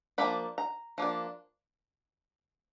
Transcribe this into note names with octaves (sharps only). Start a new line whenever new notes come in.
F3 A#3 D4 B5
A#5
F3 A#3 D4